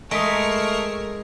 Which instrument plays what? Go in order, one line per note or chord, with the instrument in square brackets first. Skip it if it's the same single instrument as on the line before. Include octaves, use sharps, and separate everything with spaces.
[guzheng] G#3 [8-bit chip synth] A3 C#6 C7 [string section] A#4 [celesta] D#6 B6 D7